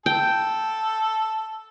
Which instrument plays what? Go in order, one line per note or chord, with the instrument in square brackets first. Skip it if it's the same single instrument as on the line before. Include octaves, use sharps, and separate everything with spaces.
[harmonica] A4 [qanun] G5